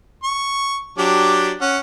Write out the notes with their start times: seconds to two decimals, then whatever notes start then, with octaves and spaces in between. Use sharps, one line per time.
0.24 C#6
0.98 F#3 D4 G4
1.61 C#4 F#5